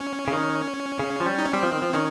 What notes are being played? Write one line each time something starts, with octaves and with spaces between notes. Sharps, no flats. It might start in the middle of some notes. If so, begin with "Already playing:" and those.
Already playing: C#4
C#3
D#3
C#3
F3
G3
D#4
C#4
G3 C4
F3
D#3
F3
D#3 C#4